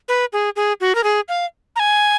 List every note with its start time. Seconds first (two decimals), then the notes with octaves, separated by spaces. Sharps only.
0.08 B4
0.33 G#4
0.56 G#4
0.81 F#4
0.95 A#4
1.04 G#4
1.28 F5
1.76 A#5
1.80 G#5